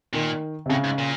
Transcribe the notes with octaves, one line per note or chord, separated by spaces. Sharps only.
A#2 D#3
C3
A2 C#3
G#2
A#2